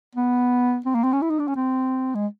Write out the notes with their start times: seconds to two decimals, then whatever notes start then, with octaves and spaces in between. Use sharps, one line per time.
0.16 B3
0.86 C4
0.95 A#3
1.04 C4
1.13 C#4
1.22 E4
1.30 D#4
1.39 D4
1.48 C#4
1.56 C4
2.15 G#3